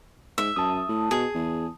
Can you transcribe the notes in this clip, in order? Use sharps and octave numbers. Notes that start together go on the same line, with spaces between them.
G#2 E5
F#2 A5 D#6
A2
B2 G#4
E2